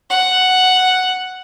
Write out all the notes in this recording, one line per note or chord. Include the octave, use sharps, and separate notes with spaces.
F#5